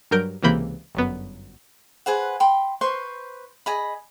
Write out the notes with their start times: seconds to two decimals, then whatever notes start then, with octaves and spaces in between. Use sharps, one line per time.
0.11 G2 F#3 A#4 G6 D7
0.43 C#2 C3 E3 A#3 B5 G6
0.95 G1 F#2 B3
2.06 G#4 B4 C5 F#5
2.40 G5 B5 C6
2.81 B4 C5 C6 C#6
3.66 G#4 D#5 B5